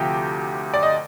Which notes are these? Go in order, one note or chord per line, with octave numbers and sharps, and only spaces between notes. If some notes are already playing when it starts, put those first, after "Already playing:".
Already playing: D2 C3 F3 G4 G5
D5
D#5